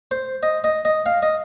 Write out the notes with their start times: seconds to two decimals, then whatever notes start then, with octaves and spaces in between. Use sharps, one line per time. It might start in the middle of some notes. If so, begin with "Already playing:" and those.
0.11 C5
0.43 D#5
0.64 D#5
0.85 D#5
1.06 F5
1.23 D#5